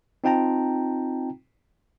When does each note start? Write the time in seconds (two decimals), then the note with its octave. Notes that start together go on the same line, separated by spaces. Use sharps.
0.24 C4 D#4 F4 G5 A5 A#5